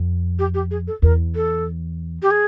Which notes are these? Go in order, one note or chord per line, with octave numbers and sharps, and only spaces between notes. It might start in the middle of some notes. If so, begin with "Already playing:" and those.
Already playing: F2
G4
G4
G#4
A4
E2 A#4
A4
G4
G#4